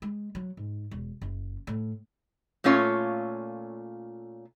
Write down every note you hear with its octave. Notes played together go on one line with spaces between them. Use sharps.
G#3
F#3
G#2
E1
F#1
A2
A#2 A3 C#4 F4 C#5